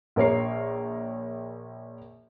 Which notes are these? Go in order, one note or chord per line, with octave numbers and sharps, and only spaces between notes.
A#1 A#4 C#5 C7